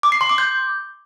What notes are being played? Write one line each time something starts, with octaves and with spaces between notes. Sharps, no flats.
D6
C7
C6
D6
G6